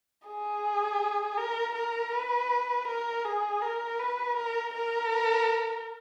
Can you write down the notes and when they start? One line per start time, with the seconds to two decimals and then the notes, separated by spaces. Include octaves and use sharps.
0.27 G#4
1.37 A#4
1.75 A#4
2.12 B4
2.88 A#4
3.24 G#4
3.62 A#4
3.99 B4
4.37 A#4
4.74 A#4